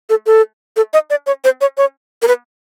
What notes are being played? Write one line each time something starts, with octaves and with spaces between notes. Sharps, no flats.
A4
A4
A4
D#5
D5
C#5
C5
C#5
C#5
A#4
B4